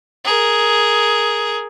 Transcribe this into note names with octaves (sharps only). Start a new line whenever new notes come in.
G#4 A#4